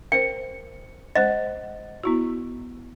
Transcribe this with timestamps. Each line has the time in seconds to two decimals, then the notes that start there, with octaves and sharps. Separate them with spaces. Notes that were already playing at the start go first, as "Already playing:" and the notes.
0.12 A#4 C5 G5
1.15 G#3 C5 D#5 F#5
2.04 B3 E4 F#4